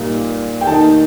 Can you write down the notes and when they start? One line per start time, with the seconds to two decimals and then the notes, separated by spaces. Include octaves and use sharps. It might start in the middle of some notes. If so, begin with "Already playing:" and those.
Already playing: A#2 G3 A#3 D#4
0.61 G5
0.67 D#3 A#3 D#4 A5